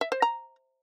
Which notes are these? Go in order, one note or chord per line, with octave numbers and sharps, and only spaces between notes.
E5
C5
A#5